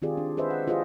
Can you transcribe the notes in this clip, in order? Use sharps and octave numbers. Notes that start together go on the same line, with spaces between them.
D#3 C4 F4 G4 G#4 D5
D4
G#4 B4 C5 D#5 E5
F#5
E4 F4 G4 G#4 C5 D#5